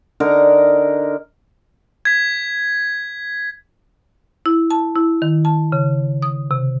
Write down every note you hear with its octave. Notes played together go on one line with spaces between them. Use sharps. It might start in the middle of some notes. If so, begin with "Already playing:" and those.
D3 D#4 A#4 A#5
G#6 B6
E4
A5
E4
D#3
A5
C#3
D#6
C3